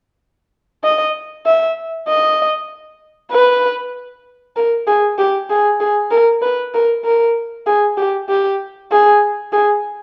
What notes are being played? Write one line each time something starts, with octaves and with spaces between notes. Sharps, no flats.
D#5
E5
D#5
B4
A#4
G#4
G4
G#4
G#4
A#4
B4
A#4
A#4
G#4
G4
G4
G#4
G#4